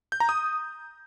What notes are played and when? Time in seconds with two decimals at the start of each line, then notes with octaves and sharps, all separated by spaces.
0.12 G6
0.20 A#5
0.29 D#6